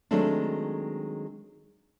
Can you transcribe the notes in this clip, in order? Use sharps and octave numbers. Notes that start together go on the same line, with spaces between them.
D#3 F#3 G#3 A3 C4 D4